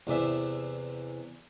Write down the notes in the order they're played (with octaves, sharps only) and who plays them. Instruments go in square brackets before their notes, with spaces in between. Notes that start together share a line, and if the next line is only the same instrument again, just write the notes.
[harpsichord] E2 C3 E3 D5 E5